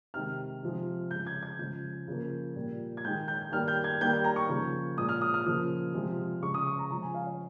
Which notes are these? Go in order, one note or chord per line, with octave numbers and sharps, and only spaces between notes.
C3 D#3 G#3 F6
C3 F3 G#3
C#3 G#3 G6
G#6
G#6
C#3 F3 G#3 G6
C#3 F3 A#3
A#2 G3 A#3
G#6
D#3 G#3 G6
G6
D#3 G3 A#3 F6
G6
G#6
D#3 G3 A#3 G6
G6
A#5
C#6
C#3 F3 A#3
A#2 G#3 D#6
F6
D#6
F6
C#3 F3 A#3 D#6
C3 F3 G#3
C#3 G#3 C#6
D#6
C#6
A#5
C#3 F3 G#3 A#5
G#5
F5
C#5